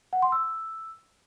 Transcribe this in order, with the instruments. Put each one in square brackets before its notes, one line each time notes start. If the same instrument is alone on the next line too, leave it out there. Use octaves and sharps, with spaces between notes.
[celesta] F#5
C6
E6